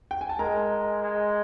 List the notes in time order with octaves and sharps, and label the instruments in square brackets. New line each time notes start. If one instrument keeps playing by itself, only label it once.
[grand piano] G5
G#5
A5
[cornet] G#3 [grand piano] A#4 A#5
[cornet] G#3